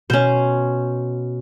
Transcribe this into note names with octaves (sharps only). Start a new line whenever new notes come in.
B2 C#4 C5